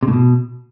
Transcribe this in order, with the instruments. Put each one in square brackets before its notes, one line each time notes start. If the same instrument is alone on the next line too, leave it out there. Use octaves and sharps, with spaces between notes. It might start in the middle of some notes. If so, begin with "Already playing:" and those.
[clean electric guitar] C3
A2
B2